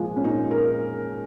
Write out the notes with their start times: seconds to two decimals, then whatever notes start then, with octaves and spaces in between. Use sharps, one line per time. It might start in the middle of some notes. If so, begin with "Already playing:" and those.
Already playing: A#2 F3 G#3
0.16 C#4
0.24 A#2 D#4
0.51 A#4